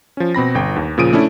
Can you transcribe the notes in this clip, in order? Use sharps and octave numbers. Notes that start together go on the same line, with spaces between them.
F3 C#4
B2 C4 B5 A#6
G1 G5
D#2
A#2 C#3 F3 D#6 D7 D#7
A3 C#4 D4 E4